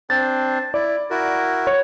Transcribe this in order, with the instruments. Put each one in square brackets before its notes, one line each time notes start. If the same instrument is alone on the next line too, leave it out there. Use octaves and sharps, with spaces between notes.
[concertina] C4 D4 C5 [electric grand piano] A6
[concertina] E4 [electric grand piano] D5
[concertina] E4 F#4 A#4
[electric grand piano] C#5